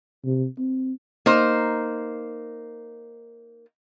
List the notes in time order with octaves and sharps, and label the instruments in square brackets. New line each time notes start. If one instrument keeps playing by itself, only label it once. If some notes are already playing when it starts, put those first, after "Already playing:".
[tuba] C3
C4
[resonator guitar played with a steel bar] A#3 D#4 C5